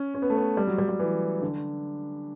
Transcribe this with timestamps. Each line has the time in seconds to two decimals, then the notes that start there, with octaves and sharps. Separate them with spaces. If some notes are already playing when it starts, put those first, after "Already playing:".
Already playing: C#4
0.14 C#4
0.22 B3
0.30 A3
0.37 B3
0.57 G3
0.67 F#3
0.78 G3
0.89 G3
0.99 E3
1.42 D3